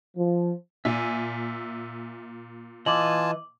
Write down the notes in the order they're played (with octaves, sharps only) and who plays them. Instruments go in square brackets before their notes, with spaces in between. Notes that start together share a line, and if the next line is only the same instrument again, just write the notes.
[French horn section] F3
[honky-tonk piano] A#2 [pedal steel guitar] E5 G#5
[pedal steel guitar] E3 D#5 [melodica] F4 G#5 A5 [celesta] D6 F#7